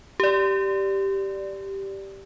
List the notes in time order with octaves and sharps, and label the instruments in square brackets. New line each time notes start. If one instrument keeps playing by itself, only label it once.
[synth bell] G4 D5